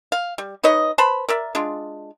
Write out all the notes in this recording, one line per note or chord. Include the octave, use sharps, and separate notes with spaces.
F5
G3
D#4 B4 C#5 D#5
B4 C5 A5 B5
A#4 D5 E5
G#3 D4 F4